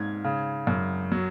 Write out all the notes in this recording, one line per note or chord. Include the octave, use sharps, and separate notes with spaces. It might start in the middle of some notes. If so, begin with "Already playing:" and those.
Already playing: G#2 G#6
C#3
F#2
F#3